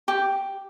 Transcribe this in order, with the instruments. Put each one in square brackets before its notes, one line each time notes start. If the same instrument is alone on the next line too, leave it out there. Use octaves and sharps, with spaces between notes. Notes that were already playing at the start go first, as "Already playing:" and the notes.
[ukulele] G4